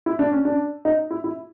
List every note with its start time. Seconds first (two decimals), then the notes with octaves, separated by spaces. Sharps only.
0.06 E4
0.19 D4
0.32 C#4
0.45 D4
0.85 D#4
1.11 E4
1.24 E4